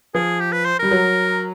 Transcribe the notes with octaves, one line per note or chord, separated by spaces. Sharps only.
F3 G#4
G4
B4
C5
G3 A#4
F#3